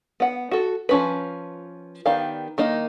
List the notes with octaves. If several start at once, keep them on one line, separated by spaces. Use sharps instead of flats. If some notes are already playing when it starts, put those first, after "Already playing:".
B3 F#5
F#4 A4
F3 C#4 B4
D#3 B3 G4 D5 F5
D#3 A#3 D#4